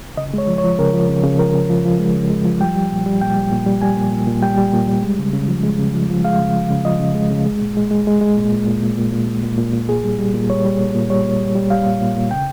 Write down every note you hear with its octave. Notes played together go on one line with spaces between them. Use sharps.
C#3 D#5
G#3 C#5
F3
C#5
F3
C#3 A#4
F3
C#3
C#3
F3 A#4
C#3
F3
F3
G#3
C#3
G#3
F3
G3 G5
G3
A#2
G3
A#2 G5
G3
A#2
G3
G3 G#5
A#2
A#2
A#2
G3 G5
G3
A#2
G3
G#3
C#3
C#3
F3
G#3
C#3
F3
F3
G#3 F5
C#3
F3
C#3
F3 D#5
C#3
G#3
C#3
G#3
A#2
G#3
G#3
G#3
G#3
A#2
A#2
A#2
A#2
A#2
A#2
A#2
A#2
A#2
A#2
A#2 G#4
G3
G3
A#2
G3 C#5
G3
A#2
A#2
G3 C#5
A#2
G3
G3
G3 F5
A#2
A#2
A#2
C#3 G5